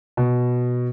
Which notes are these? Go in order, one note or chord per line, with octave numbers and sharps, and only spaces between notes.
B2